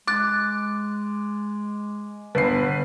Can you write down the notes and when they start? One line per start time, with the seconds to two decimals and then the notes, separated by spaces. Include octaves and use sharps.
0.07 G#3 D6 F#6 A6
2.35 G1 B3 B4 C7